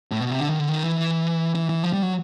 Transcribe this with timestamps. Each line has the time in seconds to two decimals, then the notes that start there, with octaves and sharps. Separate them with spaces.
0.11 A2
0.20 B2
0.31 C3
0.40 D3
0.49 D#3
0.59 D3
0.69 D#3
0.83 E3
1.55 E3
1.69 E3
1.83 F3
1.93 G3
2.03 F#3